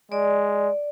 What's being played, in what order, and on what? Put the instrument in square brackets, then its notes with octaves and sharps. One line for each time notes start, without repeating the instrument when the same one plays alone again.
[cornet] G#3 [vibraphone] D5